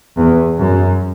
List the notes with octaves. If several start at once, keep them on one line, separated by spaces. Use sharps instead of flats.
E2
F#2